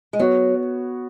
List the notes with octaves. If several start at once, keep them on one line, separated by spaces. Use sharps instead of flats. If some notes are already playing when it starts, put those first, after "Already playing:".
G#3
F#3 B3 F#4 C#5